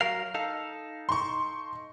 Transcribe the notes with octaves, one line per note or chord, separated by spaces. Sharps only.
F#3 A#4 F5
D#4 A4 F5
C6 C#6